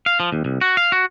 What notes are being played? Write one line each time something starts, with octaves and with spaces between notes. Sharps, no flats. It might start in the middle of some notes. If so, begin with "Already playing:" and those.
F5
F3
D#2
C2
F#4
F5
F#4